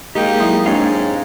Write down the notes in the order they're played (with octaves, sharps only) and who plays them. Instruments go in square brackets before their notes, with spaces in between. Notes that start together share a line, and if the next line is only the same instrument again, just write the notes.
[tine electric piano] G#3 A#3 G5 [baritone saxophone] D#4 [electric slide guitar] G4
[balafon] F#3 E4 E5
[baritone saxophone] G#2 [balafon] C4 D4 G4 [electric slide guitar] C#5 D#5 F5